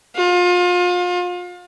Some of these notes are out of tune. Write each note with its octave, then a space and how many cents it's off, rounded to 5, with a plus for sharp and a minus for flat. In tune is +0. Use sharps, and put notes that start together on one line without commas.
F4 +35